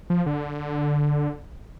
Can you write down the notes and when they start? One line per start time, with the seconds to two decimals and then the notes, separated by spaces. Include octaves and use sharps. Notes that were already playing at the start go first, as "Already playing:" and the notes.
0.10 F3
0.26 D3